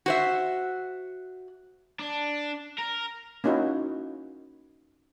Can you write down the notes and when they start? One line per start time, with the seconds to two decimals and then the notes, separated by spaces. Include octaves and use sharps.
0.06 F#4 C5 E5
2.00 D4
2.79 A#4
3.44 A#3 C#4 D#4 E4 F#4